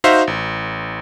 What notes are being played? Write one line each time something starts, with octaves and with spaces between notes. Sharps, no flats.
D#4 F#4 C5 E5 F5
A1